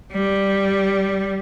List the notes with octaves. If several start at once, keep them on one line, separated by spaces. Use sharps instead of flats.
G3